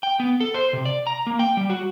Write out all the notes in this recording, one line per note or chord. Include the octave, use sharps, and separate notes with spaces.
G5
B3
A4
C5
C3
D5
A#5
A#3
G5
G3
F#4